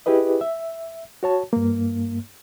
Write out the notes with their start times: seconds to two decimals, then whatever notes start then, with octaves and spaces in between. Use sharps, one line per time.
0.06 E4 G4 G#4 B4 D#5
0.41 E5
1.23 F#4 C#5 A5
1.53 G2 A#3